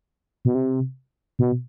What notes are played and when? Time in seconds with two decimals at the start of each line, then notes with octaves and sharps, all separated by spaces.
0.45 B2
0.55 C3
1.39 B2